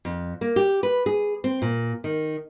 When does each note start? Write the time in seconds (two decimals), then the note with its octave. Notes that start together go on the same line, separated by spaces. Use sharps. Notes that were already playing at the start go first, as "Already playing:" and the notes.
0.05 F2
0.41 A#3
0.56 G4
0.83 B4
1.06 G#4
1.44 C4
1.62 A#2
2.04 D#3